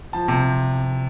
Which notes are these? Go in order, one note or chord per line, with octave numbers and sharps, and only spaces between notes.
F3 A5
C3